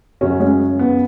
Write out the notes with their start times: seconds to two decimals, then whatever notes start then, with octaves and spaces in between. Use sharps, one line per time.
0.21 F#2 C#3 F#3 C#4 F#4
0.40 G#3 C#4
0.79 B3